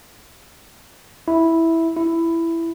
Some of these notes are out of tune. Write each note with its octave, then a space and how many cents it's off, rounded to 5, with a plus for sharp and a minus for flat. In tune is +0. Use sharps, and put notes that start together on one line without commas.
E4 -5
E4 +10